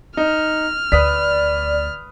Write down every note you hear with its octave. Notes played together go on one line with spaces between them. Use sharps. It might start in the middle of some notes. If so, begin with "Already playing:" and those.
D#4 F6
D2 B4 D5 D#6 B6